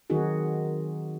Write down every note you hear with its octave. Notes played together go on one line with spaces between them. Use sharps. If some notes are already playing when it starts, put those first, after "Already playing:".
D#3 F#3 C4 D#4 F#4 G#4